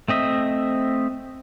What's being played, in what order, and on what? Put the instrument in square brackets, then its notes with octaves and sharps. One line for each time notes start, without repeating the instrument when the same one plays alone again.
[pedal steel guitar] A3 C4 D#5 E5